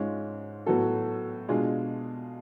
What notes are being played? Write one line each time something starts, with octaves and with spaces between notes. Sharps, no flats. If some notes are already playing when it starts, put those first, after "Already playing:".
Already playing: G#2 G#3 C#4 F4
A2 F#3 B3 F#4 A4
B2 G#3 D4 F4 G#4